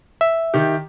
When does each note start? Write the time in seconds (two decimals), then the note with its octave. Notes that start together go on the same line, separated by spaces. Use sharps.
0.21 E5
0.54 D#3 G4